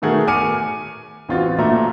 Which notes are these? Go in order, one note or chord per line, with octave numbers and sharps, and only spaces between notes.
B2 D#3 A3 F#4 G#4 A#4
G#5 D6 F6 C#7 D#7
A1 C4 F4 F#4 A6
A#2 A3 E5 A#5